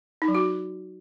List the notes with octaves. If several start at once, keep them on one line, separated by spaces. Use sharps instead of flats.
D#4
F#3
F#4